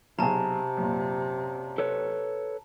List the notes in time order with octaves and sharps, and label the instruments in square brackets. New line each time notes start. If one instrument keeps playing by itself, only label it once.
[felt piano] B1 G#4 [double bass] C3 [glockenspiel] A5 A#5
[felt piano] F#2 A#2
[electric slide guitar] A4 B4 C#5